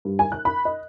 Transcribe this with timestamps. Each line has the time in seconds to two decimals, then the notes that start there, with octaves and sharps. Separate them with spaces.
0.05 G2
0.19 G#5
0.32 F#6
0.45 B5
0.65 D#5